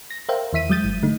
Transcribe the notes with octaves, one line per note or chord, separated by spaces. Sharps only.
A#6
A#4 C5 E5 F5 G5
E2 E3 E5 B6 D#7
F#3 G#3 D#6 G6 A6 D#7
G1
D3 A3 D#4